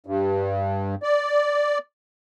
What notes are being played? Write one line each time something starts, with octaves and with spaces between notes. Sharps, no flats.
G2
D5